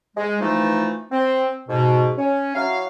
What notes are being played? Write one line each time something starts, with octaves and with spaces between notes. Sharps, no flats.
G#3
E3 F3 A3 D#4
C4
G#2 B2
C#4
F#3 E4 F5